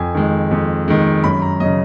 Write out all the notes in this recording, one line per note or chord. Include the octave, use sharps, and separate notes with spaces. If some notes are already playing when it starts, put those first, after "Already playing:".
Already playing: F2 G#5
D#3 G#3
F2
D#3 G#3
F#2 B5
A#5
C#3 F#3 D#5